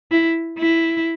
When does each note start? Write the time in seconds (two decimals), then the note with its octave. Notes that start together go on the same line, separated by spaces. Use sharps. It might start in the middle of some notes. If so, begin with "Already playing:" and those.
0.12 E4
0.59 E4